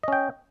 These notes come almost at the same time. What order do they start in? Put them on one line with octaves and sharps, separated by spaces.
D#5 C#4 G5